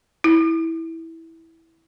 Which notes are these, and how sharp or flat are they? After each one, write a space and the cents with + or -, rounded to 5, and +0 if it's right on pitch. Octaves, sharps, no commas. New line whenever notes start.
E4 -10